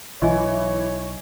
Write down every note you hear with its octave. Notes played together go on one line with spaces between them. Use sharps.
B1 E3 C#5 D#5 G#5